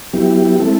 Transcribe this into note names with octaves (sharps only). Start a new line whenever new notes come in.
F#3 B3 E4 G4
G#3 C4 E4 A4